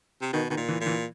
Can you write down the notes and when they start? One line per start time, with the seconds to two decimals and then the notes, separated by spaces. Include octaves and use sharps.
0.21 C3
0.33 B2 D#3
0.50 B2 D#3
0.57 A#2
0.69 E3
0.81 A#2
0.86 E3